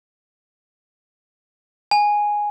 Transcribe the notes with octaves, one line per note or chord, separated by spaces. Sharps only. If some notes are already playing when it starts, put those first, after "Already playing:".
G#5